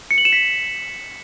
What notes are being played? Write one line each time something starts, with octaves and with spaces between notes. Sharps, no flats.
C#7
F#7
E7
B6